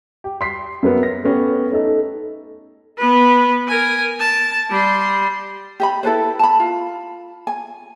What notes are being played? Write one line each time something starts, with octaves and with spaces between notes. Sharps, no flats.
G4
C6 B6 C7
F#2 A#3 B3
A#6
A3 B3 C#4 G4
A3 D#4 A4
B3 B4
A#4 G#5
A5
G3 C6
G4 D#5 B5
E4 A4 B4 C5
A5 B5
F4
G#5